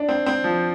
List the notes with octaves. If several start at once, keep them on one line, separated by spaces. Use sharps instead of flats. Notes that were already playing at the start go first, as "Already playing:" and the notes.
Already playing: D4
C4
C4
F3